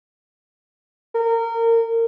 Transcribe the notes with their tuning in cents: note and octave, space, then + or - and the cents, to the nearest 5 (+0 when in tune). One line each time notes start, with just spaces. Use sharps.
A#4 -25